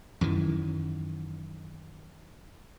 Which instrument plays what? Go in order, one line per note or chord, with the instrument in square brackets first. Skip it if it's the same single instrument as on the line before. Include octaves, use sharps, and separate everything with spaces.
[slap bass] F#2 D#3 E3